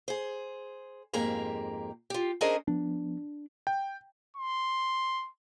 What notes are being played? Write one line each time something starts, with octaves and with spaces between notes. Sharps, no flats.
G#4 C5
F2 G#2 A#3 G4 G#4 A#5
F4 G4
C#4 D4 G#4 A#4 C5 D#5
F3 B3 D4
G5
C6